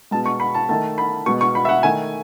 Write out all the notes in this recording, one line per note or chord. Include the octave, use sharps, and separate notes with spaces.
B2 G#3 A5
C#6
B5
A5
D#3 A3 A5
B5
B2 G#3 C#6
C#6
B5
E5
F#5
D#3 A3 G#5